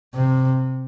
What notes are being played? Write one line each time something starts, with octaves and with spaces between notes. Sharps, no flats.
C3